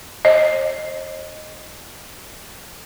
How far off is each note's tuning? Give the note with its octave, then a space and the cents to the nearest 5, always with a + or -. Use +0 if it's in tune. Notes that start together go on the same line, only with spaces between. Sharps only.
C5 +45 D#5 -5